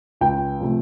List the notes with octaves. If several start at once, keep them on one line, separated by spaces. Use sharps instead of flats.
C#2 G5
C3 F3 A3